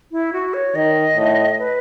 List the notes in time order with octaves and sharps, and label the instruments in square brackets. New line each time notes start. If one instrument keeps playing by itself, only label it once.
[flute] E4
F#4
C#5
[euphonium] D#3 [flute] D#5
[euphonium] A2
[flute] B4